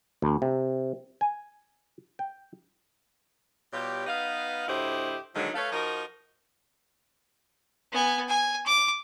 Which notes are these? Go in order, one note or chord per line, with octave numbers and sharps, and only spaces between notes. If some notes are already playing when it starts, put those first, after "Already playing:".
D2
C3
G#5
G5
B2 G3 F4 G4 C#5
B3 D#4 B4 F5
D2 A2 E4 G4 C5 D#5
D3 D#3 F3 F#3 G#3 D#4
A3 A4 B4 C#5 F5
F3 D#4 F#4 A#4
B3 G#5
G#5
D6